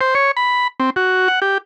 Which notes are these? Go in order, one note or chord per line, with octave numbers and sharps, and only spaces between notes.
C5
C#5
B5
C4
F#4
F#5
G4